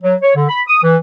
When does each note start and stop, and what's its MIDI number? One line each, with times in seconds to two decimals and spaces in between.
0.03 0.15 54
0.22 0.35 73
0.36 0.45 50
0.49 0.61 83
0.68 0.80 87
0.83 0.97 52